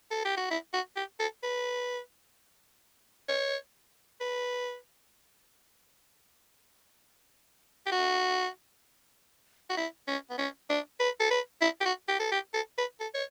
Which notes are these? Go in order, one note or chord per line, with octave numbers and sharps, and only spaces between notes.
A4
G4
F#4
E4
F#4
G4
A4
B4
C#5
B4
G4
F#4
F#4
E4
C#4
B3
C#4
D4
B4
A4
B4
E4
G4
F#4
G4
A4
G4
A4
B4
A4
C#5